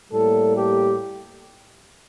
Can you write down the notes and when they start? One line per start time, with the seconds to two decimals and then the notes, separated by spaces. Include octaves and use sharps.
0.11 A2 G3 A#3 A4
0.55 G4